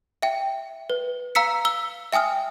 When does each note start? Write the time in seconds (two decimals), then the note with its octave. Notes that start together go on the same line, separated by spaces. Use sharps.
0.22 E5 G5
0.90 B4
1.35 F5 A#5 E6 B6 C#7
1.65 E6 G7
2.12 E5 G5 G#5 D#6 F6